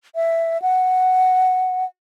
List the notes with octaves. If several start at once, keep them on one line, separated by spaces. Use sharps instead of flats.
E5
F#5